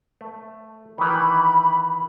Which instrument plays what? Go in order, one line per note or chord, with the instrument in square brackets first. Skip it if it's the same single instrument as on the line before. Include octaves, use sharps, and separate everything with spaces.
[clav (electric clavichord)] A3
[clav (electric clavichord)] D#3 E3 [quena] B5